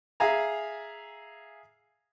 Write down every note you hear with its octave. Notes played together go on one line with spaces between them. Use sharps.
G#4 E5 F5 G#5 A#5